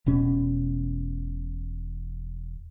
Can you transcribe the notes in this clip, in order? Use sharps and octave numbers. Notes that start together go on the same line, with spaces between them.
E1 B2 C#4